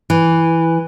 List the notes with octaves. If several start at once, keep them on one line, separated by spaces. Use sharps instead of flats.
E3